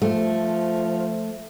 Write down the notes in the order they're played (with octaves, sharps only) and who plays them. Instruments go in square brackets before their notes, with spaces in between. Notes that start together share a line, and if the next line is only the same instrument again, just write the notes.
[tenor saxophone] F3 [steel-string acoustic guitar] A3